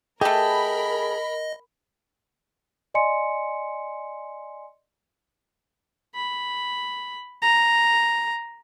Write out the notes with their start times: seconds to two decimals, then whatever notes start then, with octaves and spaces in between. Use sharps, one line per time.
0.21 A3 G4 G#4 A#4 D#5 A5 B5
2.94 D5 D#5 G#5 C6 C#7
6.15 B5
7.42 A#5